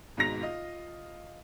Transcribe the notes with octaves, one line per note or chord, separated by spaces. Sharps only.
G#1 G#2 B2 A#5 A#6 F7
F4 D#5